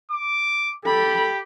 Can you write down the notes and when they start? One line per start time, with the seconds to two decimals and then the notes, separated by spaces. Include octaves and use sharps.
0.11 D6
0.85 G4 A4 B5